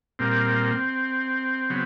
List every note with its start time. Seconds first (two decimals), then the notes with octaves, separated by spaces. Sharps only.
0.19 A#2 G3 A#3 C4
1.70 C#3 F#3 B3